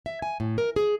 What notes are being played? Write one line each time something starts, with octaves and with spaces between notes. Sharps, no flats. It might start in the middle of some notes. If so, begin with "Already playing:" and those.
E5
G#5
A2
A#4
G#4